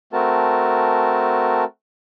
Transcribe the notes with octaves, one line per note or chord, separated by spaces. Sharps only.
A3 C4 F#4 A#4 A5